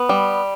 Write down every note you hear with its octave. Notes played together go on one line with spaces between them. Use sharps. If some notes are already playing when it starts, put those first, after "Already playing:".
Already playing: B3
G3